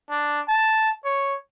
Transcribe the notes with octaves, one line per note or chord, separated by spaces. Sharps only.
D4
A5
C#5